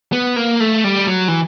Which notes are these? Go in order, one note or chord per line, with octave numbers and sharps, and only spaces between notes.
B3
A#3
A3
G3
F#3
E3